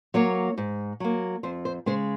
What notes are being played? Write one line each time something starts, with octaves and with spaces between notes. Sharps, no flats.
F#3 A#3 C#5
G#2
F#3 A#3
F2 C5
C5
C#3 G#3 C5